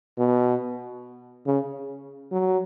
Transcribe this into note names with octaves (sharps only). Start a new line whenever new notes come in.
B2
C#3
F#3